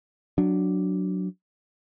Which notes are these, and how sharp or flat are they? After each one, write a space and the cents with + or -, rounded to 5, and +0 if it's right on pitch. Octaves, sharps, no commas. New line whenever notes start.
F#3 +0 D4 +0